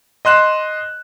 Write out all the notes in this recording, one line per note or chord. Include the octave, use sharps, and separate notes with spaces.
D#5 C6 F#6 E7